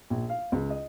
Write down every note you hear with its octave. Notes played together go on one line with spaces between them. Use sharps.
A#1
F5
C#2
D#5